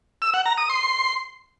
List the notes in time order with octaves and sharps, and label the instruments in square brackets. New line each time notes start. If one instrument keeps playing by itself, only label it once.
[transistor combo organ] E6
F#5
A#5
D#6
C6